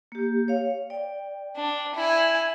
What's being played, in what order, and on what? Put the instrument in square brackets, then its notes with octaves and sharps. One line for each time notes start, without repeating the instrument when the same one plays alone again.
[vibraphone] A#3 G4
C#5 F5
D5 G5
[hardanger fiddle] D4
E4 G#5